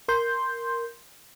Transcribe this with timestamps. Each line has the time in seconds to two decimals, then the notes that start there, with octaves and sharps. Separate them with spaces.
0.08 A#4 C6 G6